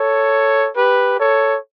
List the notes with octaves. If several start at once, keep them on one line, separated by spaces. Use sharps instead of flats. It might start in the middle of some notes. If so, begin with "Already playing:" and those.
Already playing: A4 C#5
G4 B4
A4 C#5